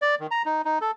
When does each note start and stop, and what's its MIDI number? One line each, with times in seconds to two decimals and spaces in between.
0.02 0.15 74
0.20 0.27 51
0.31 0.42 82
0.46 0.62 63
0.65 0.79 63
0.81 0.91 69